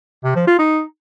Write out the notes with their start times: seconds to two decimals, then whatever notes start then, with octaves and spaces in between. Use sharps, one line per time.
0.24 C3
0.36 F3
0.47 F4
0.59 D#4